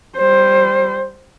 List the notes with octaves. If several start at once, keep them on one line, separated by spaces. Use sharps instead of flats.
G3 C5